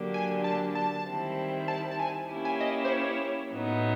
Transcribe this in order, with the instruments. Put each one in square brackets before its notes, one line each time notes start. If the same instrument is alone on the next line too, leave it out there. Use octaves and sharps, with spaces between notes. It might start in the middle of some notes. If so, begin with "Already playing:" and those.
Already playing: [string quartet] D3 F#3 A#3 D4 G4
[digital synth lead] G#5
A5
A5
[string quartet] D#3 G3 C4 E4
[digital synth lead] A5
A5
G#5
[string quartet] A#3 C#4 E4 G4
[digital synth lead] G#5
D#5
C5
C#5
[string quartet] A2 F#3 B3 D#4